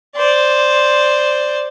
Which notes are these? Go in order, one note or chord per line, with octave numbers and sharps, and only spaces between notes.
C5 D5